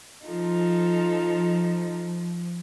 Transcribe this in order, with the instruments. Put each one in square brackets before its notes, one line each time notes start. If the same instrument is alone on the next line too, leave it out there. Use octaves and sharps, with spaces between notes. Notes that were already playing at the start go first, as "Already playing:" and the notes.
[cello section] F3 [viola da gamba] D#4 F4 A4